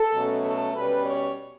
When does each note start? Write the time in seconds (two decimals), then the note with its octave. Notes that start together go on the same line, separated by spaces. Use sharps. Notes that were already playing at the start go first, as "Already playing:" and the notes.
Already playing: A4
0.14 B2 F#3 A3 C#4
0.44 A4
0.75 B2 G3 C#4 B4
1.05 C#5